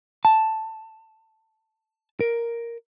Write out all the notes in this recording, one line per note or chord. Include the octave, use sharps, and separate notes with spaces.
A5
A#4